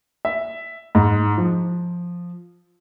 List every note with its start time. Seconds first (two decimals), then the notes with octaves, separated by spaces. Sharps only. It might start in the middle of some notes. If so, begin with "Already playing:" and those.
0.25 E5
0.95 G#2
1.37 F3